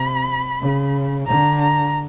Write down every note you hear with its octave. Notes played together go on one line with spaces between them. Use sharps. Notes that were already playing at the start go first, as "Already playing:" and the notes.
Already playing: C3 B5
C#3
D3 A#5
A#5